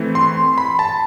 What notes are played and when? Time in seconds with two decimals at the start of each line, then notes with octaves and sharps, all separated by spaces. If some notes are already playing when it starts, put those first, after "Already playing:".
Already playing: E3 A3 C4
0.15 C6
0.58 B5
0.79 A5